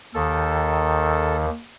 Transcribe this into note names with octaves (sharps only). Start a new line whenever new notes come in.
D#2 D#3 A4